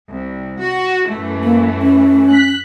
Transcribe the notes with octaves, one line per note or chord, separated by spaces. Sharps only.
C2
F#4
F#2 E3 A3
A#3
C#4
F#6 B6